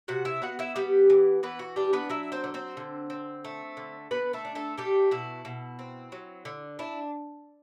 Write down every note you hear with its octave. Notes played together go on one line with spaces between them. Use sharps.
C3 F#4 F#5
E4 E5
B3 F#4 F#5
E4 E5
G3 B3 G4
E3
E3 B3 B4
F#4
G3 D4 G4
B3 B4
F#3 E4 E5
C4 C5
D3
C4 C5
D3
C4
A3
D3
D3 B3 B4
A3 A4
D4
A3 A4
G3 A3 G4
B2 E4
B2
C4
F#3
D3
D4 E4